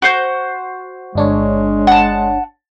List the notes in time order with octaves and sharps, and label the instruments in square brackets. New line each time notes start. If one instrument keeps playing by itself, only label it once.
[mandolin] F#4 C5 G6
[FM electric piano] G1 D4 C#5 [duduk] G#3
[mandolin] F#5 A5